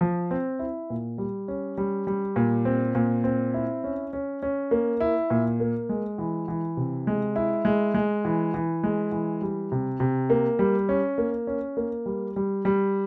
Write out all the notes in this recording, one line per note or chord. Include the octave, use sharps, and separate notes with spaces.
F3
C4
E4
A#2
G3
C#4
G3
G3
A#2
C4
A#2
C4
E4
C#4
C#4
C#4
A#3
E4
A#2
A#3
G#3
E3
E3
C3
G#3
E4
G#3
G#3
E3
E3
G#3
E3
G3
C3
C3
A#3
G3
C#4
A#3
C#4
A#3
G3
G3
G3